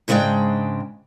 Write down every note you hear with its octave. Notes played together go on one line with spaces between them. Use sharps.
G#2 C#3 G#3 D4 G5